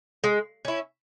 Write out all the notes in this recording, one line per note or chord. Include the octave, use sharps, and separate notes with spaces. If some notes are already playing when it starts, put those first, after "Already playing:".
G#3
C#4 E4